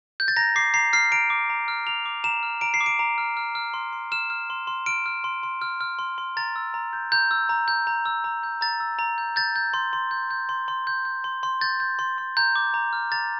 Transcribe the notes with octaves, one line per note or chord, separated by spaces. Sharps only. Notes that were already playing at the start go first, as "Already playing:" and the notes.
G6
A6
A#5 A#6
D6 C7
A#5 C7
F6 C7
A#5 D7
D6
A#5
F6
A#5 F7
D6
A#5 E7
F6
A#5 D7
C7
D6
D7
A#5
F6
F6
F6
C6
C6
F6 E7
F6
C6
C6
F6 D7
F6
C6
C6
F6
F6
C6
C6
A#5 A6
E6
A#5
G6
A#5 G6
E6
A#5
G6
A#5
E6
A#5
G6
A#5 A6
E6
A#5
G6
G6 A6
G6
C6
C6
G6
G6
C6
C6
G6
G6
C6
C6
G6 A6
G6
C6
C6
A#5 G6
D6
A#5
F6
A#5 A6